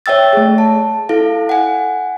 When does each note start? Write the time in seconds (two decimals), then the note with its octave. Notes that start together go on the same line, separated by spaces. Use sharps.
0.06 C#5 E5 G5 E6 A6
0.33 A3 G#4
0.58 A5
1.09 E4 A4 F5
1.49 F#5 G#5